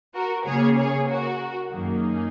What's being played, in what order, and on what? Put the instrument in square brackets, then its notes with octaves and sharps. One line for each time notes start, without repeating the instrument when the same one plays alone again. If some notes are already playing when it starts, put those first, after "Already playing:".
[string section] F#4 A#4
C#3 A#3 G#4 C#5
G#4 C#5
F#4 A#4
F#2 D#3 F#3 A#3 D#4 G#4